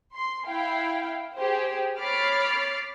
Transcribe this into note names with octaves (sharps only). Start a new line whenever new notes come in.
C6
E4 F5 G5
G4 G#4 C5
C#5 B5 D6 F6 A6 C7